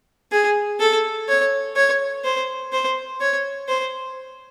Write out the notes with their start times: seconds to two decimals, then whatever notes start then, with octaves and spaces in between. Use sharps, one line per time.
0.32 G#4
0.80 A4
1.28 C#5
1.76 C#5
2.24 C5
2.72 C5
3.20 C#5
3.68 C5